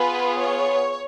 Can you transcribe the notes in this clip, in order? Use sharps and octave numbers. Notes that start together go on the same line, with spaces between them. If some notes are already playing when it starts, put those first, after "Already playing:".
Already playing: B3 F4 G#4 B4
C#5